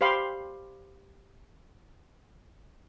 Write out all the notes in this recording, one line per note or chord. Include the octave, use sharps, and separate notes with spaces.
G4 C5 F5 B5 C6